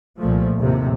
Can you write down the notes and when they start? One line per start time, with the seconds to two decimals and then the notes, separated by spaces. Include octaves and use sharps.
0.19 C2 A#2 F3 A3
0.56 A#1 D#2 A2 C3